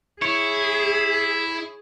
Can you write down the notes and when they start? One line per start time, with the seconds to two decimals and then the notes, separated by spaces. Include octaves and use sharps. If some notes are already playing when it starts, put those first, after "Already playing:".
0.22 E4 G#4 C#5